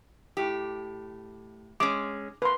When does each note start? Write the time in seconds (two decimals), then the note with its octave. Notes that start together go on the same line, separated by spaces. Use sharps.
0.37 A2 G4
1.80 G#3 C#4 D6
2.42 A#3 B4 C6